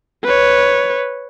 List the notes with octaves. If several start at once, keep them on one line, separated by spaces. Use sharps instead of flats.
B4 C#5